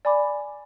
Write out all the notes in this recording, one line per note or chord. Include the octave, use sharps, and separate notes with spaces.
D5 G#5 B5 D6